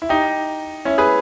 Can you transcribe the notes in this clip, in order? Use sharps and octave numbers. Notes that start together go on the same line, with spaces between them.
E4
D#4 G4
C#4 E4
G#4 B4